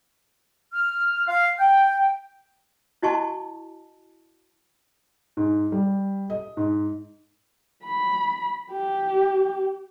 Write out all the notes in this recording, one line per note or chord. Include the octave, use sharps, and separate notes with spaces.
F6
F5
G5
E4 F#4 D#5 G#5 A5 C#6
G#2
G3
D#5
G#2
B5
G4